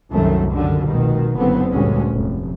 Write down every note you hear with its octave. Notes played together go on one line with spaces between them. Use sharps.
C2 F#2 D#3 A3
F#2 D3 D#3 G3
F1 B2 D#3
F#1 D3 B3 C4
D2 G2 A#2 D3 G#3 C#4
F1